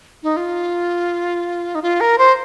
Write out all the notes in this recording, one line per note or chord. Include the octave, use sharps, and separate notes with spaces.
D#4
F4
D#4
F4
A#4
C5